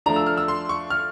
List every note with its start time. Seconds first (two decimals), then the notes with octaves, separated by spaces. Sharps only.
0.06 F3 A3 D4 A#5
0.16 E6
0.26 F6
0.38 E6
0.48 C6
0.69 C#6
0.90 F6